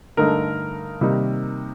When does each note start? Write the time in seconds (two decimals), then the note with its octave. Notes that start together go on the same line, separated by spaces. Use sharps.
0.17 G2 D3 A3 D#4 A#4
1.01 C3 D#3 G3 A#3 D#4